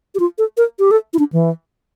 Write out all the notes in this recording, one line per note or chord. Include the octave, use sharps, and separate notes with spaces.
G4
F4
A4
A#4
G4
A4
E4
D4
E3